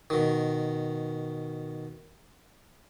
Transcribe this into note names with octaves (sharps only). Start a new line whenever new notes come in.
B2 D#3